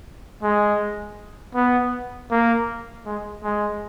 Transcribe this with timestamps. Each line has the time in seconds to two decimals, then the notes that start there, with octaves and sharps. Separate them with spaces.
0.43 G#3
1.55 B3
2.31 A#3
3.06 G#3
3.43 G#3